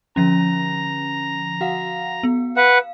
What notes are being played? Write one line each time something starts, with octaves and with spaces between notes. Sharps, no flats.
D3 F3 C#4 A#5
F#4 F5 F#5
B3
B4 F5 F#5